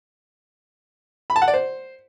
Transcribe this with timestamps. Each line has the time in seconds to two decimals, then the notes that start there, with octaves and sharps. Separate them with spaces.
1.30 B5
1.36 A5
1.42 F#5
1.48 D5
1.54 C5